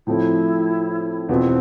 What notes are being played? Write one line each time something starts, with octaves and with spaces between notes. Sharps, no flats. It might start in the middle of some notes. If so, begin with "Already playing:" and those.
A2 F3 A3 C4 E4
E2 B2 B3 C4 F4